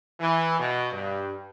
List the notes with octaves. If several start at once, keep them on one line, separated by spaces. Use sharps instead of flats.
E3
B2
G2